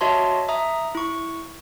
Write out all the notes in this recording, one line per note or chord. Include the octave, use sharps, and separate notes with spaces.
F#4 C#5 D#5 E5 A5 C6
E5 A#5 D#6
E4 C#6